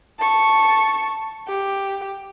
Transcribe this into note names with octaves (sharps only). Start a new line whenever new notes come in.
A5 C#6
G4